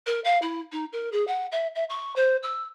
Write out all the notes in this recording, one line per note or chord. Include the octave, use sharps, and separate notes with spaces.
A#4
F5
E4
D#4
A#4
G#4
F#5
E5
E5
C#6
C5
E6